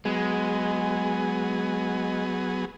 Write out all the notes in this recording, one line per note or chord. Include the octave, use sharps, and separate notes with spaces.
F#3 G#3 B3 G#4